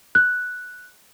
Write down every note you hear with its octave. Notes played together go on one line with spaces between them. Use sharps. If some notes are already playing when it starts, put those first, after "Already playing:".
F#6